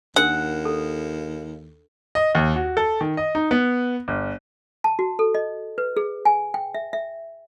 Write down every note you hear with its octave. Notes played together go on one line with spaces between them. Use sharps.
D#2 D4 A#4 F#5
A4
D#5
D#2
F#4
A4
D#3
D#5
D#4
B3
G1
A5
F#4
A4
D#5
B4
G#4
G#5
G5
E5
E5